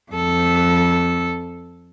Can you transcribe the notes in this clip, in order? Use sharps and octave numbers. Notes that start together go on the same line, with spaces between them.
F2 A4